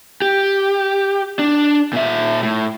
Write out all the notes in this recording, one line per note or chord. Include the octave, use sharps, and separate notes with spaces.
G4
D4
A#2 E5
A2